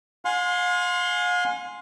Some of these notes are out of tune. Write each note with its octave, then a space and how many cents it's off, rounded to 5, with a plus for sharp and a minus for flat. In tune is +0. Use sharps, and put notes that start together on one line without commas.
F5 +45 G#5 +0 C6 +0